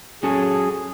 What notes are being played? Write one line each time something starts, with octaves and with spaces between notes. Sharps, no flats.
F#3 C#4 G#4 A4